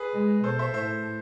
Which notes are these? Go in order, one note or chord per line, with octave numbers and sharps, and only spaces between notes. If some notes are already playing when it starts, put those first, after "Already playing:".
Already playing: G#4 B4
G#3
B2 A4 C5
C5 E5
A2 C5 E5